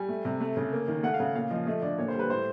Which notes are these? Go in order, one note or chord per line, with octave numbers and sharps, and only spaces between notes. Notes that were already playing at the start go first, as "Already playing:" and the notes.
Already playing: G3 G#5
A3
C3
A3
C#3
A#3
D#3
A3 F#5
F5
C#3
F5
A#2 F5
F3 D#5
A3 D#5
D3 D5
A#2 C#5
C5
G3
B4
A2 C5